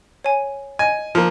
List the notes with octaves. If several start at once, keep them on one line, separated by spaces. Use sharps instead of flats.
C#5 G#5
D#5 G#5
F3 A#3